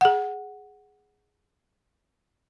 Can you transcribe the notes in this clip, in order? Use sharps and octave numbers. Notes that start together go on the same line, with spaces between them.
G#4 F#5